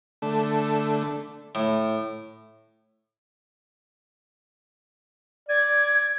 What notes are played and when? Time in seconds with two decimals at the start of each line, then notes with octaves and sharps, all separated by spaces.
0.22 D3 A3
1.55 A2
5.49 D5 G#6